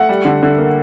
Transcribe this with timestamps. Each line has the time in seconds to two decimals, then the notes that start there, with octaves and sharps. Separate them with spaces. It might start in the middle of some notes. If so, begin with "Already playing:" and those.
Already playing: A3 F#5
0.09 G3
0.25 D3
0.43 D3
0.58 A#3